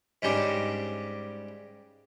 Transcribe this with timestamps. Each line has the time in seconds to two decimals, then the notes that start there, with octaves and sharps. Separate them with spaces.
0.22 G#2 C#3 G3 D4